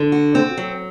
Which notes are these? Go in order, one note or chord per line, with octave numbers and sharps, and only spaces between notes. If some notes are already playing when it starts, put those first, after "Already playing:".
Already playing: D3
F#4
C4
F#3